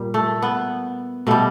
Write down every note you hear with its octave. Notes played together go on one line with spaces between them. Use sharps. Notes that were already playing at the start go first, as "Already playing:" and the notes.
Already playing: A#2 G3
A3
B3
B2 G3 A3